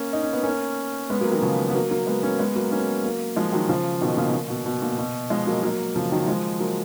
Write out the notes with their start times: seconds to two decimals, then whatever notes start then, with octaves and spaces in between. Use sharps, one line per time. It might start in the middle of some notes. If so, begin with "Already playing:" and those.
Already playing: A#3 C#4
0.13 D#4
0.23 C#4
0.33 B3
0.43 A#3 C#4
1.10 G#3 B3
1.21 F#3 A#3
1.31 D#3 F#3
1.42 C#3 F3
1.70 B3
1.75 F#3 A#3
1.91 F#3 A#3
2.07 G#3 B3
2.23 A#3 C#4
2.39 G#3 B3
2.56 F#3 A#3
2.72 A#3 C#4
3.04 F#3 A#3
3.36 F3 G#3
3.52 D#3 F#3
3.69 C#3 F3
4.01 B2 D#3
4.17 A#2 C#3
4.33 A#2
4.50 B2
4.66 B2
4.82 A#2
4.98 B2
5.30 F3 G#3
5.47 F#3 A#3
5.63 F#3 A#3
5.96 C#3 F3
6.12 D#3 F#3
6.28 F3 G#3
6.60 F#3 A#3